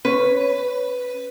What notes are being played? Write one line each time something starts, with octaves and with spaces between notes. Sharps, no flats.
C#4 B4 C#5